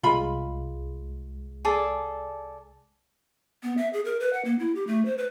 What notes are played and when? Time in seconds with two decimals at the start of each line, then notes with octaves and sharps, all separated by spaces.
0.03 C2 G#3 F4 B5
1.65 G#4 A4 D5
3.63 B3
3.77 E5
3.93 G#4
4.05 A#4
4.20 B4
4.33 F#5
4.45 A#3
4.59 E4
4.75 G4
4.87 A3
5.05 C5
5.18 B4